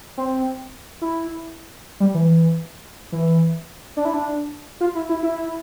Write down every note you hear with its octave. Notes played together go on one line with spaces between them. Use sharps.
C4
E4
G3
E3
E3
D4
E4
D4
F4
E4
E4
E4